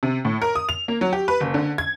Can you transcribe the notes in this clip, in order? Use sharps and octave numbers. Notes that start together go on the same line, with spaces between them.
C3
A2
A#4
D#6
F7
A#3
F#3
G4
B4
F#1
D3
G#6